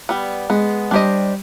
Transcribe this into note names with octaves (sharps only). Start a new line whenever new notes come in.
G3 B3
G#3 B3
G3 D4 G4 C5 D#5